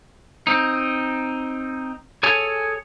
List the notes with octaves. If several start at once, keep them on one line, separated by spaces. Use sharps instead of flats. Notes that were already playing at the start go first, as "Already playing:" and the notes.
C4 D#4
G#4 A4 C#5 G#5